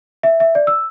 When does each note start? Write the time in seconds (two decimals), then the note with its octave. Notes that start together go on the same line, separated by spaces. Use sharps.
0.23 E5
0.40 E5
0.55 D5
0.67 E6